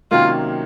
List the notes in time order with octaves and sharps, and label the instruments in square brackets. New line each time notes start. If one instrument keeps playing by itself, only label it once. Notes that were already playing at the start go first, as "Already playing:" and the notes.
[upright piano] C3 D#3 F#3 A#3 C#4 [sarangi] F4